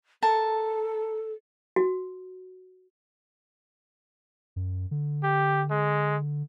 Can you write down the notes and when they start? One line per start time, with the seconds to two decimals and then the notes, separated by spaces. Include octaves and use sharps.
0.23 A4 A#4 A5
1.76 F#4
4.56 F#2
4.91 D3
5.23 G4
5.71 G#3